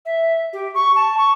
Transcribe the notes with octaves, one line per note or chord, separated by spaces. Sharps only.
E5
G4
C#6
A5
C#6